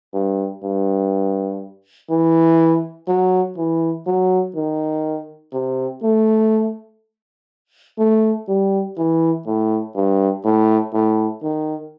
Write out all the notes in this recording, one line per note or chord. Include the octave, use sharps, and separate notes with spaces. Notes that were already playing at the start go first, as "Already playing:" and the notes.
G2
G2
E3
F#3
E3
F#3
D#3
C3
A3
A3
G3
E3
A2
G2
A2
A2
D#3